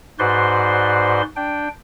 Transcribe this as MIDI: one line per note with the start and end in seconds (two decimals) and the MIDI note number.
0.19 1.22 44
0.19 1.22 66
0.19 1.22 71
0.19 1.22 72
0.19 1.22 74
0.19 1.22 84
1.36 1.68 62
1.36 1.68 79